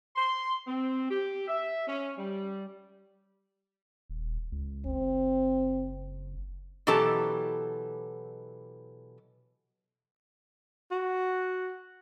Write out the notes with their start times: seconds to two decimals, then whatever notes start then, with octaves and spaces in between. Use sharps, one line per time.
0.16 C6
0.67 C4
1.10 G4
1.48 E5
1.87 C#4
2.18 G3
4.09 D#1
4.52 C#2
4.86 F#1 C4
6.87 B2 E3 F#3 G4 A4 A5
10.91 F#4